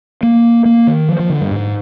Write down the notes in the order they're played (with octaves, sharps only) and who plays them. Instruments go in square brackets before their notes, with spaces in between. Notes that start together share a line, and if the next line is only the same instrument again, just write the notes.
[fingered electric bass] A#3
A#3
D#3
F3
F3
D3
G2
G#2